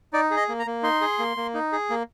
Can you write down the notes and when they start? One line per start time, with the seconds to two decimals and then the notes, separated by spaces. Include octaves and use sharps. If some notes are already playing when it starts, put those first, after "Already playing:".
0.13 D#4 D5
0.31 G#4
0.37 D#5
0.49 A#3
0.59 A#5
0.66 A#3
0.83 D#4 C6
1.01 G#4
1.19 A#3
1.37 A#3
1.54 D#4
1.72 G#4
1.90 A#3